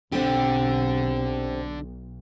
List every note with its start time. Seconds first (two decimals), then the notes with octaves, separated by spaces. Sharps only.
0.12 B1 D3 C4 G4